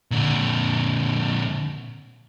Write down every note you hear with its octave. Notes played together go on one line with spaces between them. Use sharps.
A#2 D3